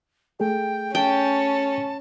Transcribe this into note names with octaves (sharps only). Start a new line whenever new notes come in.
A3 G#4 A4 G5
C#4 G5 A5